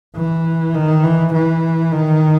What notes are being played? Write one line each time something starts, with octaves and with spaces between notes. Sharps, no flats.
E3
D#3
E3
E3
D#3